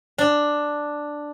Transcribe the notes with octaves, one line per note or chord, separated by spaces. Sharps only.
D4